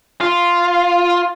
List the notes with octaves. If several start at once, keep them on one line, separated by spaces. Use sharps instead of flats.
F4